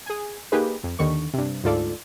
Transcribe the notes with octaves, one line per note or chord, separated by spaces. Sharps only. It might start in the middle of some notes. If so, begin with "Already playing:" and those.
G#4 G#5
A#3 D#4 G4 G#4 B4
F2
D#2 D3 D#3 C#6
G2 C3
D2 G#2 F4 A4 D5